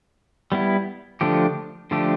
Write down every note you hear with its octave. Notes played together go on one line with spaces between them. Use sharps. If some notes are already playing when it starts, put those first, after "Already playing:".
G3 B3 E4
D3 F3 A3 D4 G4
D3 F3 A3 D4 G4